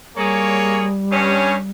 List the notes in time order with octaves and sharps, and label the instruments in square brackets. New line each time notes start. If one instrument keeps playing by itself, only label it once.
[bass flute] G3 [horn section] A#3 G#4 C#5
[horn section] G2 C#4 C#5